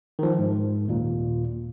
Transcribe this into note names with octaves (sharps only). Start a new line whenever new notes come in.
D#3 F3
G#2
D#2 A#2